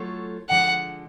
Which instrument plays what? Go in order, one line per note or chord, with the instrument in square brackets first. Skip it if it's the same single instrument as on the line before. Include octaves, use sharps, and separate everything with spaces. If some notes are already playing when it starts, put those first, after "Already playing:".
Already playing: [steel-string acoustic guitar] F#3 A3 F4 A4 C#5
[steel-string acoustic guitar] D3 F3 G#3 [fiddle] F#5